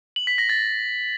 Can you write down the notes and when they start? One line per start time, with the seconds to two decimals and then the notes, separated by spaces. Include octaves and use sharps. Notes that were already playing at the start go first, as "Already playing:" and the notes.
0.16 F#7
0.27 B6
0.38 A#6
0.49 A6